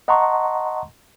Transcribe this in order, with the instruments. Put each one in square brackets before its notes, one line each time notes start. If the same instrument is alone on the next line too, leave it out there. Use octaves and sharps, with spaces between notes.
[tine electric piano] D#5 F#5 A5 A#5 C6 C#6